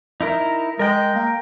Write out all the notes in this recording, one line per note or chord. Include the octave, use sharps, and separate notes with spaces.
D#4 E4 A#4
G#3 A#4 G5
A#3